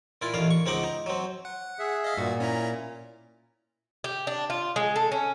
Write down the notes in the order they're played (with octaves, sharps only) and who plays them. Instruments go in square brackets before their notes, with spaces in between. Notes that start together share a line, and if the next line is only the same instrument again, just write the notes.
[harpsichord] A#2 E4 F4
A1 D#3 D4 F5
C#6
C#2 C4 D#4 F#5 D6
D#4
F#3 C4
[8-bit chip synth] F#5
[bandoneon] G#4 E5
[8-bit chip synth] D#5 F5
[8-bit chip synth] G2 F#4 [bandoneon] A#2
[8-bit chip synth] C#4 E4 A#5
[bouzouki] G4
D4
F4
G#3
A4
C#4